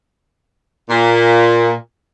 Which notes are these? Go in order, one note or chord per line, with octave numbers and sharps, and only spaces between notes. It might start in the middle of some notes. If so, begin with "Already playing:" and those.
A#2